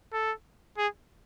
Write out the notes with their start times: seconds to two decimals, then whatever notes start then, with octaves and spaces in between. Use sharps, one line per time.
0.13 A4
0.78 G#4